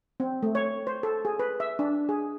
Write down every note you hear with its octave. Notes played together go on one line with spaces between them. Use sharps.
C4
A3
C#5
C5
A4
G#4
B4
E5
D4
G#4